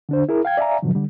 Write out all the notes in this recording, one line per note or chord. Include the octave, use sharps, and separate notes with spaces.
D3 D4 C5
E4 G#4 A#4
F5 G5 G#6
D5 E5 F5 G#5 A#5
G#2 B2 D3 F3 F#3
D3 G3